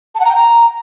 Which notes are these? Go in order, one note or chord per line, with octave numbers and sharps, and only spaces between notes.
A5
F#5
A#5
G5
A#5